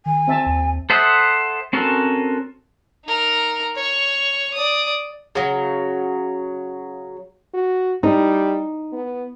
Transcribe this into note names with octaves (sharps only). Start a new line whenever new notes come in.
D#3 G#5
C4 E5 A5
D#2
A4 C5 E5 F#5 D#6
C4 C#4 F#4 A4 A#4
D#4 A#4
C#5 C#6
D5 D#6
C#3 F#3
F#4
G3 D#4
B3